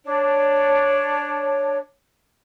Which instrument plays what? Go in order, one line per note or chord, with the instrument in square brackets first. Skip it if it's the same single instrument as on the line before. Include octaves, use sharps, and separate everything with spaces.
[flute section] D4 C#5